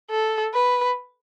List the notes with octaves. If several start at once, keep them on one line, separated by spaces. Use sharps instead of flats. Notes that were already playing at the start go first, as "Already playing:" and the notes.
A4
B4